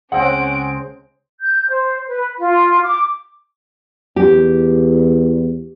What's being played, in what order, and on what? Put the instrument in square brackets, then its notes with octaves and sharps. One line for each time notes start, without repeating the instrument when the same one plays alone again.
[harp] C#2 [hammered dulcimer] G#3 C4 [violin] C#4 D7 [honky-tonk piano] F#5
[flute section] G6
C5
B4
F4
D6
[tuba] E2 [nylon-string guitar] G4